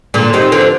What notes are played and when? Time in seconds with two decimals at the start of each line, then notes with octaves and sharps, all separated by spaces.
0.14 A#2 D3
0.33 C3 D#3
0.52 D3 F3